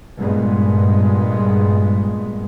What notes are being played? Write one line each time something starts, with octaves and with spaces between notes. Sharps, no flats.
G2 A#2 G#3 B3